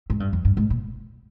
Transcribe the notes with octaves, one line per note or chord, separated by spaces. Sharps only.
G#2
G2
F2
G2
G#2
A#2